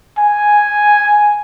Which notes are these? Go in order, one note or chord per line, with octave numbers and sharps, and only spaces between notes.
G#5